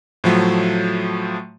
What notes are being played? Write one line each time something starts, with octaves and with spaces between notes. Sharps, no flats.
A2 F3 F#3 A3